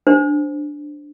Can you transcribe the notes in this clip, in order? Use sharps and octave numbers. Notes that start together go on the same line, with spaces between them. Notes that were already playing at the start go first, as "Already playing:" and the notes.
D4 C5